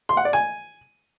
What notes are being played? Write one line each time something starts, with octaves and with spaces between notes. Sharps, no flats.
C6
F#5
D5
G#5